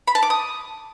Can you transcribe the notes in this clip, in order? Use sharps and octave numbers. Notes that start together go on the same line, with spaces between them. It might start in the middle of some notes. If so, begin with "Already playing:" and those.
B5
A5
D6
D#6